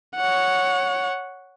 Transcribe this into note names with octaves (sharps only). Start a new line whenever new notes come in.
C#5 F#5